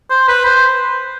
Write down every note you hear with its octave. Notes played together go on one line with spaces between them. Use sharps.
C5
B4
C5